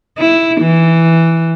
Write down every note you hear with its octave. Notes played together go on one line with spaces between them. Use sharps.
E4
E3